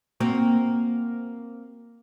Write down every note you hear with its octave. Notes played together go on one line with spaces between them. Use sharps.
A#3 C4 F#4